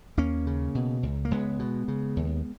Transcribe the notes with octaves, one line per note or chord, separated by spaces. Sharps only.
D#2 A#3 C#4
C#3
B2
C#2
A#3
C#2 G#3 B3
B2
C#3
D#2